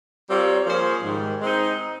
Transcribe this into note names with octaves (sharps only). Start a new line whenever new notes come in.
G3 C4 F4 A#4 C#5
F3 A#3 C#4 G#4 C5
G#2 D#3 G3
G#3 C4 D#4